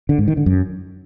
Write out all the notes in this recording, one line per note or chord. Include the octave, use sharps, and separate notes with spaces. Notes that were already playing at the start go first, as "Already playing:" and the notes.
D3
G#2
D#3
D3
F#2